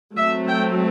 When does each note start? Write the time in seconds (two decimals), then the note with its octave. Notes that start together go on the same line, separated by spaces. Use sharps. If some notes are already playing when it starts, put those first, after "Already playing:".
0.17 F#3 A3 C4 E5
0.47 G5